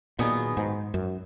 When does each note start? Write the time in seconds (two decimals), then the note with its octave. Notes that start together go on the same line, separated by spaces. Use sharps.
0.19 A#2 D#3 F#3 B3 D#4 G#4
0.57 G#2
0.94 F#2